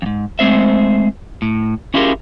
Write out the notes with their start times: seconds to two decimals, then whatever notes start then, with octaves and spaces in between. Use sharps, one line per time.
0.02 F2 G#2
0.39 G#3 A3 C4 C5 E5
1.42 A2
1.94 C#4 E4 F4 G4 G#4 A#4